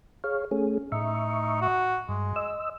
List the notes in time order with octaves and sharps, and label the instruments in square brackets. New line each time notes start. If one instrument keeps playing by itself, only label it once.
[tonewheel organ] G#4 C#5 F5
A3 C#4 G#4
[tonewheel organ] A2 E5 C#6 [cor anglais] D#4
[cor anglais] F#4
[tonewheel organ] G2 [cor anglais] G#3
[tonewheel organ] D#5 E6